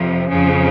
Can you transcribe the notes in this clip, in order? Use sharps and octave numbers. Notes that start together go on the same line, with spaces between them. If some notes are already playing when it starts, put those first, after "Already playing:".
Already playing: F2 C3 F3
F2 C#3 F3